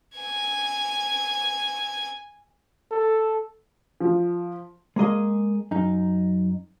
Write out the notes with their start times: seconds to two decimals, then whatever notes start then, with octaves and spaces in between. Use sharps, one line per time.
0.18 G#5 G#6
2.91 A4
4.00 F3
4.96 G#3 A#3 G#4 D#5
5.71 F#2 D#4